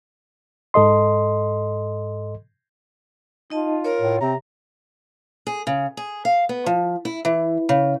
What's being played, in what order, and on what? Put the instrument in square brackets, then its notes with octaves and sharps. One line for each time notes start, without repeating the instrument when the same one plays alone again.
[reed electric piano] G#2 A4 D#5 C6
[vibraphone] D#4 D#5 A5 [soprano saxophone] F4
[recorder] A#4 [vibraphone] C#5
[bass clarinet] A2
[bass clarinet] C3 [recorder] C4 [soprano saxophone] A#5
[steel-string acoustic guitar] G#4
C#3
G#4
F5
B3
F3
E4
E3
C#3